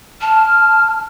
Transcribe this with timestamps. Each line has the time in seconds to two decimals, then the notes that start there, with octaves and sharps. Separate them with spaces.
0.21 A5 F6